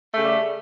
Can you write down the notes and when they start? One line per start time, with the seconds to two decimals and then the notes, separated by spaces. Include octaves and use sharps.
0.12 A3
0.16 C#3
0.21 G3